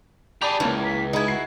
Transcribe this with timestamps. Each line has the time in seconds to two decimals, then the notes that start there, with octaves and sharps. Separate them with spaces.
0.42 G4 G#4 D5 A5 B5 F7
0.60 C#2 E3 A#3 C#4
0.84 B6
1.13 G#3 D#4 E4 G#4 B5 G#6
1.28 F#4 C7